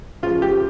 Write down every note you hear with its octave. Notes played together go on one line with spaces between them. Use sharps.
C#3 F3 F4
G4